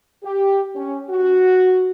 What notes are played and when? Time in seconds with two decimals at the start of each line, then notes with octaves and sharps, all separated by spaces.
0.23 G4
0.76 C#4
1.10 F#4